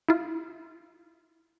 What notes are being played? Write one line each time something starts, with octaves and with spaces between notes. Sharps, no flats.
E4 F4